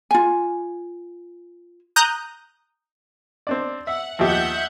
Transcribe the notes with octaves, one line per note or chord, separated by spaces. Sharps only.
F4 G#5
A#5 D#6 F#6 G6
C4 D4 D5
E5 F#5
D#2 F3 G4 E5 F#5 G6